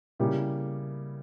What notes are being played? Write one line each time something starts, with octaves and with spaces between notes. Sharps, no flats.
C#3 G3 A#3 E4 G4